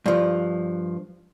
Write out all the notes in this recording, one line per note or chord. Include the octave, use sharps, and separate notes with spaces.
G2 F3